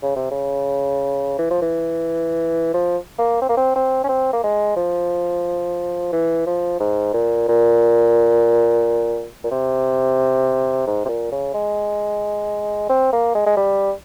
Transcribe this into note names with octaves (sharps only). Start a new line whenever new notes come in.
C#3
C3
C#3
E3
F3
E3
F3
A#3
C4
A#3
C4
C4
C#4
C4
A#3
G#3
F3
E3
F3
G#2
A#2
A#2
A#2
C3
G#2
C3
A#2
C#3
G#3
C4
A#3
G#3
G#3
G3